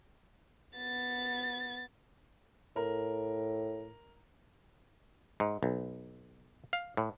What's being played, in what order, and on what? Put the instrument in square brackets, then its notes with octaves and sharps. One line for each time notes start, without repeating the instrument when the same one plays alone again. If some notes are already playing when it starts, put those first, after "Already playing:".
[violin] B3 A6
[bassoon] A2 [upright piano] A#4
[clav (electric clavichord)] G#2
B1
F5
A2